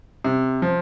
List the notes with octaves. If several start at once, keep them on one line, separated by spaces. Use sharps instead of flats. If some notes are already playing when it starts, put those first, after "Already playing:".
C3
F3